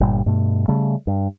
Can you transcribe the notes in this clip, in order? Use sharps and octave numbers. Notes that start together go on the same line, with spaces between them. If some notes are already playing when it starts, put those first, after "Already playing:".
G1 A#2 G3
G2 B2 A3
C#3 G3 A3
G2